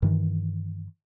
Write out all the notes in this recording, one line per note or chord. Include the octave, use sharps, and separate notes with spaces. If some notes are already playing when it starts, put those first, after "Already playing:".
G2 D#3 E3